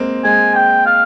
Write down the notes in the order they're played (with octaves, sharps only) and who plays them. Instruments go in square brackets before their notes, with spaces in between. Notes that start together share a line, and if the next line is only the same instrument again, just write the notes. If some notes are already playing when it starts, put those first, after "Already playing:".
Already playing: [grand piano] G#3 A#3 C4
[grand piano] G#3 [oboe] G#5
[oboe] G5
F5